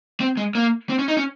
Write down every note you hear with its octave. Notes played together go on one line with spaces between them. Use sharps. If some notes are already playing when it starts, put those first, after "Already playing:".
C4
G#3
A#3
C4
C#4
D#4
C#4